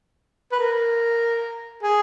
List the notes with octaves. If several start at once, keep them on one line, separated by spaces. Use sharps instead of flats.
B4
A#4
G#4